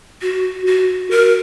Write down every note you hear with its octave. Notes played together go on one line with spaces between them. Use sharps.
F#4
F#4
A#4